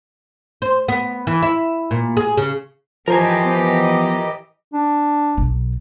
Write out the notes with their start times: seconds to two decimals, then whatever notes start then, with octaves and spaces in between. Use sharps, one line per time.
0.62 C5
0.88 B3
1.27 E3
1.42 E4
1.91 A#2
2.17 G#4
2.37 C#3
3.08 E3 F3 G4 A#4 C5 D#5 G#5
3.45 B3
4.73 D4
5.37 B1